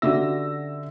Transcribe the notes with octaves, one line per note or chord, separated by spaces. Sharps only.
D3 C#4 D4 F#4 G4 E5 E6 A#6